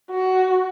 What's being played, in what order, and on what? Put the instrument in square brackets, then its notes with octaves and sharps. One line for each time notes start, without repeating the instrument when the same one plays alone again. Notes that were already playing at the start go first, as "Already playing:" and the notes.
[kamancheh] F#4